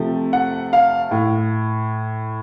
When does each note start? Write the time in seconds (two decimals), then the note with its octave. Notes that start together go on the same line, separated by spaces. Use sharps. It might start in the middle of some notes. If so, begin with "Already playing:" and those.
Already playing: C3 F3 A3
0.33 F#5
0.73 F5
1.11 A2